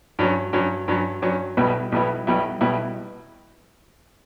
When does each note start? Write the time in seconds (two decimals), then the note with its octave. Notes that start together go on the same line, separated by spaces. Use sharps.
0.19 G2 F#3 C#4
0.53 G2 F#3 C#4
0.88 G2 F#3 C#4
1.22 G2 F#3 C#4
1.57 B1 B2 G3 B3 E4
1.92 B1 B2 G3 B3 E4
2.27 B1 B2 G3 B3 E4
2.61 B1 B2 G3 B3 E4